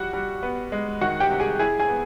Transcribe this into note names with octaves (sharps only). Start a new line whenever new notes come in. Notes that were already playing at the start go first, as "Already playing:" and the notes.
Already playing: F3 G3 F#4 F#5
G3
B3
G#3
D#3 F#4 F#5
G4 G5
C3
G#4 G#5
E4 G#4 G#5
G#4 G#5
B3